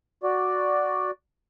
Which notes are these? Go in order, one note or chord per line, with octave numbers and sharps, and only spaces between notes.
F#4 D5